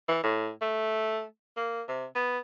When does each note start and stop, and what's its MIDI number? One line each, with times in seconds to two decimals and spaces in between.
0.08 0.21 52
0.24 0.50 45
0.61 1.24 57
1.57 1.82 58
1.88 2.05 48
2.15 2.38 59